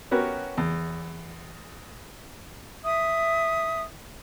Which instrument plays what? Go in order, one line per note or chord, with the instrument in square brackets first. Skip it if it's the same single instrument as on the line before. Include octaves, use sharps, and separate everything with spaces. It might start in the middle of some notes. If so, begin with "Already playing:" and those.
[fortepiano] B3 C#4 F#4 G4 A#4 B4
E2
[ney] E5 [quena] D#6